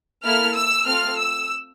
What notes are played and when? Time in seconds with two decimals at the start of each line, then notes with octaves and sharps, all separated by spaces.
0.24 A#3 E4 A4 F6
0.55 E6
0.85 A3 C4 F4 A4 F6
1.17 E6